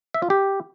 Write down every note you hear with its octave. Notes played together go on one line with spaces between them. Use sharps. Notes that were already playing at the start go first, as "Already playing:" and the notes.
E5
F4
G4